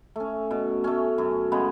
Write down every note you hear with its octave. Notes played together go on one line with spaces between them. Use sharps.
A3 C#4
B2
A3 C#4
F#2
C#3 G#3 B3